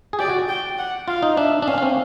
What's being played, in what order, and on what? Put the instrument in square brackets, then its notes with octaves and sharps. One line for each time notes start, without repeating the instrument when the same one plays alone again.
[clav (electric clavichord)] G#4
[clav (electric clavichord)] G4 [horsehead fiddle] D5
[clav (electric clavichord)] F#4
[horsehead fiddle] G5
F#5
[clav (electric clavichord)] F4 [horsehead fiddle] F5
[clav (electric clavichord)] D#4
[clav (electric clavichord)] D4 [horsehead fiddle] E5
[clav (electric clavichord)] D4
[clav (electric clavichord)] C#4 [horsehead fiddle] F5
[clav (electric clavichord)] C#4
C4